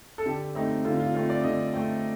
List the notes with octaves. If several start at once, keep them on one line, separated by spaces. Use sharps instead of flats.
A4
D3 G4
A3 C4 D#4
D3 F4
F4
A3 C4 F4
D5
D3 D#5
A3 C4 G5